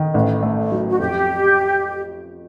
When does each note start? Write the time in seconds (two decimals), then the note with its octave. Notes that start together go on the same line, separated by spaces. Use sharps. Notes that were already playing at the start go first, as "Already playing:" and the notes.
Already playing: D#3
0.14 A1
0.43 A3
0.72 F#3
0.91 F#4
0.99 F2 G4